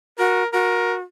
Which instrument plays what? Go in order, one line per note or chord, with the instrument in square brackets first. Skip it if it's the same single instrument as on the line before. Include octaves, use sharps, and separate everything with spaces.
[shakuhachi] F#4 [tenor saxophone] A#4
[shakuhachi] F#4 [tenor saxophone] A#4